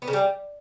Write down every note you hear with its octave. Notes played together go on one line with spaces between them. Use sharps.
B3
C#3
G3